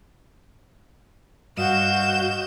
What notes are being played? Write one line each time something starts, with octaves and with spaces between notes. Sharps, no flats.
G2 F#4 D#5 F5 G6 E7